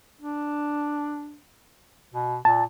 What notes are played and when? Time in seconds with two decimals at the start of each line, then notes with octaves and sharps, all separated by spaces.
0.21 D4
2.14 B2
2.45 A#2 A5